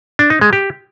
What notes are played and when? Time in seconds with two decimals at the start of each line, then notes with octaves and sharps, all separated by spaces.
0.19 D4
0.30 D#4
0.41 G#3
0.53 G4